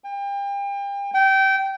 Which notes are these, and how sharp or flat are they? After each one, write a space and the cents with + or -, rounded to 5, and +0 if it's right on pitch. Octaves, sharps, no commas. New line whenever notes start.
G5 +35
G5 -20